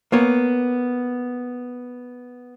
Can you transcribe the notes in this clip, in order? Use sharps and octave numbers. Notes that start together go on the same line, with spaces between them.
A#3 B3 C#5